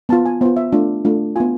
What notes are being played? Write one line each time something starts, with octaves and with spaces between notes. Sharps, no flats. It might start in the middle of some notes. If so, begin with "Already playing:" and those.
B3 F4 A5
G#5
B3 F4 C5
E5
A3 D4 F4
A3 D4 F4
B3 F4 G#5